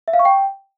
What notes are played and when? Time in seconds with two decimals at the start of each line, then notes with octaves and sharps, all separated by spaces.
0.08 E5
0.13 F5
0.19 C#6
0.25 G5